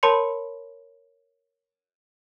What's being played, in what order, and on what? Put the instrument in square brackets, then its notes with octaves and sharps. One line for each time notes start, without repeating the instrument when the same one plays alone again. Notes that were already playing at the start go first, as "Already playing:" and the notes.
[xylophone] A#4 C#5 A5 B5 C6 C#7